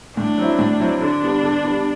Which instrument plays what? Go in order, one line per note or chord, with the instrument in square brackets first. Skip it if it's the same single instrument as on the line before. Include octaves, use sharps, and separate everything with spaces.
[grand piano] A2 [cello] D4
[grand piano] F#3 C4 E4
A2
F#3 C4 E4
[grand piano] D3 [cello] D4
[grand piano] G3 B3
D3
G3 B3